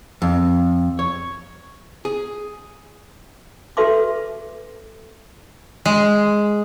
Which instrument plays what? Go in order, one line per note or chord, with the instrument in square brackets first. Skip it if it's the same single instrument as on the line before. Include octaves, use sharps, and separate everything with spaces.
[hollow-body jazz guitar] F2
C#5
G#4
[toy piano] F#4 A4 B4 E5 C6 D6
[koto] G#3